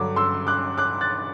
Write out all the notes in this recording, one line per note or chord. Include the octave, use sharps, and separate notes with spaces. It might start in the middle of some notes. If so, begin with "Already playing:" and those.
Already playing: G2 D3 F#3 D6
C6 E6
D6 F#6
D6 F#6
F#6 A6